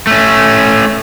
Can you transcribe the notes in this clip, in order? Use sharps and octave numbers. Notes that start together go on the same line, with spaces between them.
A3 C#4